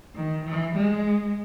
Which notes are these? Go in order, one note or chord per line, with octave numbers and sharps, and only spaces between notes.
D#3
E3
G#3